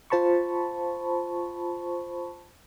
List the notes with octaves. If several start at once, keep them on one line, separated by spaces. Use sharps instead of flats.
F4 C5 A5 B5 C#6